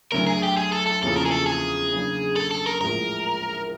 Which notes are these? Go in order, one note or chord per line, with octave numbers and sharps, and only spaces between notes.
D2 D3 F#3 A#4
G#4
G4
G#4
A4
A4
E2 C#3 F3 A#3 C#4 A4
A#4
G#4
A4
G#4
C#3 F#3 A#3 D4
A4
A4
A#4
A#1 A2 F3 G#3 A#4